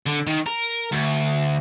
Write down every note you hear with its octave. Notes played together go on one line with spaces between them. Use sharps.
D3
D#3
A#4
D2